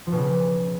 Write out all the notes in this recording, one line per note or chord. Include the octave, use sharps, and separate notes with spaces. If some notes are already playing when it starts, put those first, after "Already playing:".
F3
B2
C#3